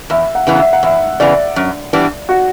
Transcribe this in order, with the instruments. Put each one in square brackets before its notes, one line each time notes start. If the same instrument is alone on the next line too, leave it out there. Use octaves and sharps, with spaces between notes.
[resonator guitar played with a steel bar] E2 [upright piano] E5
[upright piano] F#5
[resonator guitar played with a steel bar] C#3 E3 B3
[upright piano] F#5
E5
F#5
[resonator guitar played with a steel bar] E2 [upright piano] E5
[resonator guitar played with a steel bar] C#3 E3 B3 [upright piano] D5
[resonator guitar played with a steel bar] F#2
E3 G3 B3 D4
[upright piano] F#4